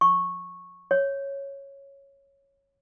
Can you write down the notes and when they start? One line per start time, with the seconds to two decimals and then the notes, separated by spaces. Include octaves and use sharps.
0.01 C#6
0.91 C#5